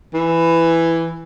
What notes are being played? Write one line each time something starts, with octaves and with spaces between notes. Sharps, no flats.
E3